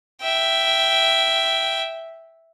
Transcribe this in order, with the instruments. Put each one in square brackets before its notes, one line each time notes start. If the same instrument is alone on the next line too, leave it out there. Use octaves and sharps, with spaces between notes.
[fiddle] E5 G5